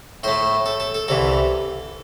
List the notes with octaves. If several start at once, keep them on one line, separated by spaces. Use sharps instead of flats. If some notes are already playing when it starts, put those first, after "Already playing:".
A2 A3 C5
A4
A4
A4
C2 C3 E3 A4